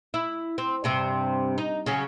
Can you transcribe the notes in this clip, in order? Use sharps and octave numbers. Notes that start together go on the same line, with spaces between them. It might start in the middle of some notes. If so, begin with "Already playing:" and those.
E4
C4
G2 C3 C4
D#4
C#3 F#3 C#4